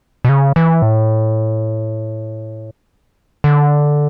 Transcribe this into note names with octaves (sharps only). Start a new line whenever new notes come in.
B2
C#3
E3
A2
D3